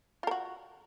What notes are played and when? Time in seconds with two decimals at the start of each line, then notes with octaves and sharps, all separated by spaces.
0.23 F4
0.27 A#4
0.31 F#4